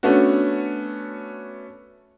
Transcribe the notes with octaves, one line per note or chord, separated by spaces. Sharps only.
A3 B3 C#4 D4 F#4